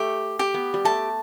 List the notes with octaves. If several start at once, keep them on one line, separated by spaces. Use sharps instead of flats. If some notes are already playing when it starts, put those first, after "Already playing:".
Already playing: A3 G4
G4
B3
G3
A3 A5